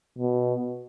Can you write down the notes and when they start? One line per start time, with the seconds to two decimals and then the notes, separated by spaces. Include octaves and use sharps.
0.18 B2